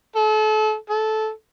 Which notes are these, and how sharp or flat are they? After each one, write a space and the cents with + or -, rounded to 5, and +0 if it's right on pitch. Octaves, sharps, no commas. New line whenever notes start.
A4 -35
A4 -15